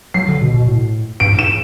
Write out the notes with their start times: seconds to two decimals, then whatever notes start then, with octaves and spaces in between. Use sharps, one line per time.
0.14 F#3 C7
0.28 D3
0.42 B2
0.54 B2
0.68 A2
1.20 G2 D7
1.31 A2
1.39 E7